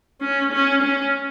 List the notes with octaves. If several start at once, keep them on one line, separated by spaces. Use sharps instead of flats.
C#4
C#4
C#4